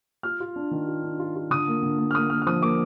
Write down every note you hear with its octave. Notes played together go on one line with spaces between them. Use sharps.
F4 F6
F4
D4
D#3
F4
D4
F4
F4
D3 D#6
A#3
D3
A#3
F6
A#3 D#6
A#3 F6
F6
F3 D#6
A#3 D6